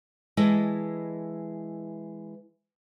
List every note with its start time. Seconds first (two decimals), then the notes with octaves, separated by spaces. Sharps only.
0.37 E3 G#3 E4 A4 D#5